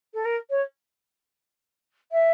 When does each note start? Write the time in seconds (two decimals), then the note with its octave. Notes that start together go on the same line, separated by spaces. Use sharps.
0.14 A4
0.25 A#4
0.50 C#5
2.12 E5